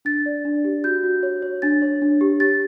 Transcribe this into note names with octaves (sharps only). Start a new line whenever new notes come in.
D4 A6
D5
D4
G4
F#4 G6
F#4
C#5
C#5
D4 A6
C#5
D4
G4
G4 A6